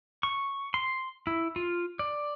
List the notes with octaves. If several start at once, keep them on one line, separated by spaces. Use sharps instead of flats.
C#6
C6
E4
F4
D5